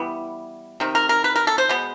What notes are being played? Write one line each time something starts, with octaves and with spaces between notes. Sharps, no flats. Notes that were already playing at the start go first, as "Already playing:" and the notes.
Already playing: E3 G3 B3
C3 D#3
A#4
A#4
B4
A#4
A4
C5
B2 G#3 B3